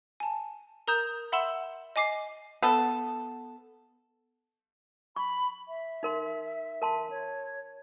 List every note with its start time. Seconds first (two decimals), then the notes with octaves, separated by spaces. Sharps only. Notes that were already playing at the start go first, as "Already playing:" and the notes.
0.20 G#5 A5
0.88 A#4 A#5 D#6 G6 E7
1.32 E5 F#5 B5 C6 E6 E7
1.96 D#5 G#5 D6 C7
2.62 B3 A4
5.16 B5 C#6
5.68 E5
6.03 D#4 A#4 C6
6.82 A#4 A5 C6
7.10 C#5